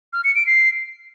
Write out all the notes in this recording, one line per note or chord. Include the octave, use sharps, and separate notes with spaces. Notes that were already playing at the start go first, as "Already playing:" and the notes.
F6
C#7
D7
C7